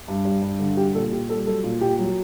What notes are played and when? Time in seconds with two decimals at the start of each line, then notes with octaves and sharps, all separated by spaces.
0.08 G2
0.25 G3
0.42 G2
0.60 D3
0.77 G3 G4
0.95 A#2 A4
1.12 A#2 G4
1.29 G3 A4
1.47 F#3 A4
1.64 A#2
1.81 A#2 G4
1.99 F#3